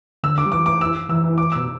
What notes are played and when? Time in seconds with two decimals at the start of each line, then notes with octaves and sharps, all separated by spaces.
0.23 D3 E6
0.38 D6
0.46 G3
0.52 E3 D6
0.66 D6
0.81 E6
1.09 E3 E6
1.38 D6
1.52 B2 E6